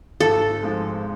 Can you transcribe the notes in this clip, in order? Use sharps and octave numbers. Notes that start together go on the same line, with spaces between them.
G#1 A4
G#2 F3 G#3